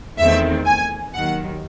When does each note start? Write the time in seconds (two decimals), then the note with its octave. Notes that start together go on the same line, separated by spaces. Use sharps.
0.18 E2 D#3 A3 C4 E5
0.66 G#5
1.13 D#2 D#3 F#3 F#5